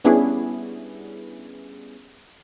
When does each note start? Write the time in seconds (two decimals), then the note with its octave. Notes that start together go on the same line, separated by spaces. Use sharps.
0.04 G3 B3 C#4 D4 E4 G#4